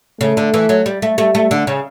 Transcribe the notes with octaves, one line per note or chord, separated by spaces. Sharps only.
C#3 A3
D3
E3
F#3
G3
A3
G3 A3
A3
D3
C#3